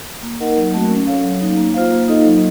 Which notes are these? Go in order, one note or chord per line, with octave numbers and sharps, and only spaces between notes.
A#3
D#4 A#4 D#5 F#5
F#3
A3 C4 F#4
C#4
A4 C#5 F5
F#3
A#3 D#4
A#3
F4 C5 F5
A#3
D#4 A4 D#5
F#3